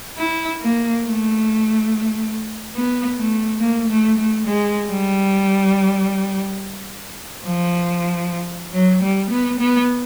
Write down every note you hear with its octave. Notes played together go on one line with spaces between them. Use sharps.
E4
A#3
A3
B3
A3
A#3
A3
A3
G#3
G3
F3
F#3
G3
B3
B3